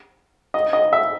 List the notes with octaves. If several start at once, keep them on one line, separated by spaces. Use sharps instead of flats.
D#5
D#5
E5